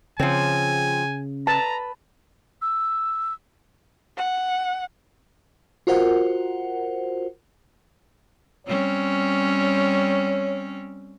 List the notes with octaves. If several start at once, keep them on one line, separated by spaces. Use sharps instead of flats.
C#3 F3 C4 G#5
B4 A5 A#5
E6
F#5
F4 F#4 A#4 C5 F#5
G3 C4 C#4 C#5